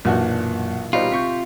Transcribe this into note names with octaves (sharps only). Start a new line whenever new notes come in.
B1 F#2 A#2 E3 F#3 A#3 D4 F#4
B2 G3 D#4 F4 G4 A#4 C5
C3 C#6 G6 B6